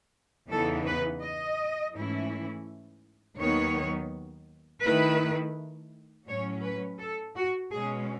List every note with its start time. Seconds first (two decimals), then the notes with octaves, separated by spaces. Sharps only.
0.49 E2 C#3 E3 B3 D#4 A4
0.86 B4
1.22 D#5
1.94 G#2 E3 A3 C#4 E4
3.38 D#2 D#3 F#3 B3 C#5
4.83 D#3 A3 E4 B4
6.27 A2 F#3 C#4 C#5
6.63 B4
7.00 A4
7.36 F#4
7.72 B2 G#3 C#4 G#4